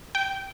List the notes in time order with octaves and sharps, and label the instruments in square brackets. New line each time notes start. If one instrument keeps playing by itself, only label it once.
[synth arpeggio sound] G5